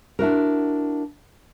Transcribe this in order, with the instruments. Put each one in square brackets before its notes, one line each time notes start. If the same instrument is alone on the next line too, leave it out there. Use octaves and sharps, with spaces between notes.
[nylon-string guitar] D4 E4 F#4 A#4